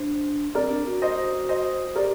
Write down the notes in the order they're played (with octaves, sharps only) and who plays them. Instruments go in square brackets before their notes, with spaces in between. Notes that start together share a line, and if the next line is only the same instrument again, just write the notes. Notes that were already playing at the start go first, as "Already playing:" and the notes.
Already playing: [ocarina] D4 [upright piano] C5
[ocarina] C4 [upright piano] A#4 D5
[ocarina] D4
F#4
[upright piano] C5 D#5
C5 D#5
[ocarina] G4 [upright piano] A#4 D5